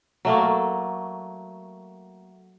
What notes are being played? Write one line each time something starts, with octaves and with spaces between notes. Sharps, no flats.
F#3 A3 A#3